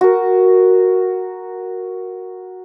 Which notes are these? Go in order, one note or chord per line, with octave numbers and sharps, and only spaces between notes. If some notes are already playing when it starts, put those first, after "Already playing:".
F#4 A#4